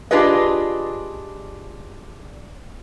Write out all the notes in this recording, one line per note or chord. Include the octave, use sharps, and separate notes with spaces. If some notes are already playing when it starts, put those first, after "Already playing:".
D4 F4 G4 G#4 B4 D#5